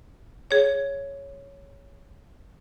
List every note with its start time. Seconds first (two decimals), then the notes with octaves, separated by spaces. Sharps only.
0.51 G#4 C#5